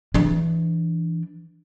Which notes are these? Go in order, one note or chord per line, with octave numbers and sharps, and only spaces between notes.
E3 D4